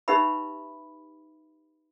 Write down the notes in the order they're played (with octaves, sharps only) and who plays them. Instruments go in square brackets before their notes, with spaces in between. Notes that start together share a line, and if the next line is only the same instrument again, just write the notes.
[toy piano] C#4 D#4 G4 B4 E5 B5